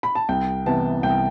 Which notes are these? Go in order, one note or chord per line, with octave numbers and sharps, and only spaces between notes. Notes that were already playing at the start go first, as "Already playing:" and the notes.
B5
A5
C2 G5
C3 E3 B3 A5
C2 G5